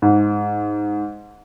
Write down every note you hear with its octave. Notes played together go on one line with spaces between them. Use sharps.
G#2